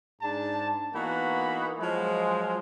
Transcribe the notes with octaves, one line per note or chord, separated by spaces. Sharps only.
G#2 D4 A5
E3 A#3 B3 D#4 F#4 B5
F3 F#3 G#3